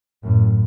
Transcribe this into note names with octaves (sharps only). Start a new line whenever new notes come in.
F#2 A2